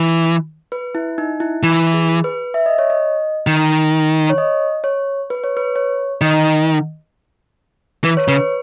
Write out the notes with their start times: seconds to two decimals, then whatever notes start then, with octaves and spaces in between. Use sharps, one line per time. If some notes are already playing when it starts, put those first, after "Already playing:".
Already playing: E3
0.72 B4
0.95 E4
1.18 D#4
1.40 E4
1.63 E3 E4
1.94 G#4
2.24 B4
2.54 E5
2.66 D#5
2.78 C#5
2.90 D#5
3.47 D#3
4.30 C#5
4.38 D#5
4.84 C#5
5.30 B4
5.44 C#5
5.57 B4
5.76 C#5
6.21 D#3 D#5
8.04 E3 B4
8.17 C#5
8.28 C#3 B4